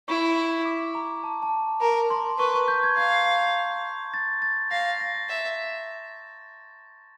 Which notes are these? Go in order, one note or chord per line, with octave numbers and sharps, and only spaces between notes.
E4 C#6
D6
A#5
A5
A5
A#4 A#5
C6
B4 C#6
C#6
G6
G#6
F5 G#6
A6
A6
F5 A#6
A#6
A6
E5